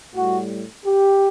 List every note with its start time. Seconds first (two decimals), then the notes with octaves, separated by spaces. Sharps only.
0.15 A2 G3 F#4
0.86 G4